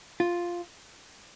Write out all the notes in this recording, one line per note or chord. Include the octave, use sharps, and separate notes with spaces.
F4